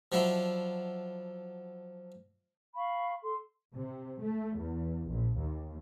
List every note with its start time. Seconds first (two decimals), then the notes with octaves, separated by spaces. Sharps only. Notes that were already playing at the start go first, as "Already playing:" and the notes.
0.12 F3 F#3 D4 E4
2.76 F5 B5 C#6
3.22 A4 C6
3.74 C3
4.22 A3
4.58 E2
5.09 A#1
5.38 D#2